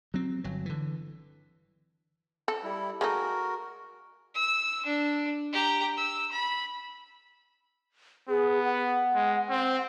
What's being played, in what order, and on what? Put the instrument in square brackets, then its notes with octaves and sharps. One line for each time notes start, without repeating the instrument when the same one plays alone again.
[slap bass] F#3 C4
G1 F#3
D3 E3
[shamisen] A4
[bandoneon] G3 E4
[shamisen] G#3 A3 D#4 [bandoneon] F#4 A#4
[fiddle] E6
D4
G4 A#5
E6
B5
[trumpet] B3 [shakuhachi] G#4
[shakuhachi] F#5
[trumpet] G#3
C4